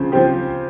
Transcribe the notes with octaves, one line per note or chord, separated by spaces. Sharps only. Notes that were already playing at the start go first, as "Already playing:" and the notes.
Already playing: C#3 F3 C4
F3 C4 G4